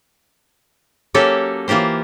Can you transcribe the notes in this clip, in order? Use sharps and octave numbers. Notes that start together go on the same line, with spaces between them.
F#3 A#3 C#4 G4 A4
E3 A#3 F4 G4 C5